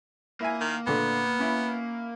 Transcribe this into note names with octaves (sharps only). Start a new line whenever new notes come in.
A#3 E4 E5 G#5
D#3
A#2 D3 A3 B3
C#4 E4